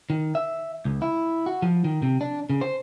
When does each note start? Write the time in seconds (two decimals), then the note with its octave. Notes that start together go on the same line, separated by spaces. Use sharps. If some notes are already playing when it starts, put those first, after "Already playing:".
0.10 D#3
0.35 E5
0.85 C#2
1.02 E4
1.46 F#4
1.62 F3
1.84 D#3
2.02 C3
2.21 D4
2.50 C#3
2.61 C5